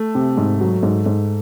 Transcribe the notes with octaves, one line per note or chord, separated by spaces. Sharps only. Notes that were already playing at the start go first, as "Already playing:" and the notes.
Already playing: A3
C3
G#2
F#3
G#2
G#2